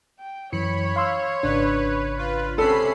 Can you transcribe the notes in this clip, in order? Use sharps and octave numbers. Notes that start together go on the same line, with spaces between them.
G5
F#2 E3 C#5 B5 C#7
F5 C6 E6
G#1 C#3 D4 B4
F4 B4
C3 C#4 A4 B5 C7